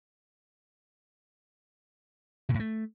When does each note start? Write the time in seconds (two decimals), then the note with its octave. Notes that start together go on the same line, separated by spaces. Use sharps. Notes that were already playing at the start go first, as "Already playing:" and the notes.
2.49 C3
2.54 A2
2.60 A3